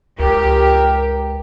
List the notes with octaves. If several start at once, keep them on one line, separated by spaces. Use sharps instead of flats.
C#2 G4 A#4